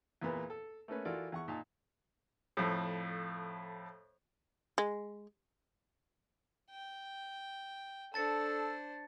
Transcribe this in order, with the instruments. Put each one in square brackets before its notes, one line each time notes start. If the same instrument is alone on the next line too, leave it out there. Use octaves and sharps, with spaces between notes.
[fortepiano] E2 A#2 A#3 B3
A4
A3 A#3 C#4 B4
E3 F4 F#4 A4 A#4 D5
E2 F#5 C#6
A#2 D#4 A5
F2 A2
[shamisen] G#3
[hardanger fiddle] G5
[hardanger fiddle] D4 C5 [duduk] A4 [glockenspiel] A5 A6 C#7